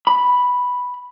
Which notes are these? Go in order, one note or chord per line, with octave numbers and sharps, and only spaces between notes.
B5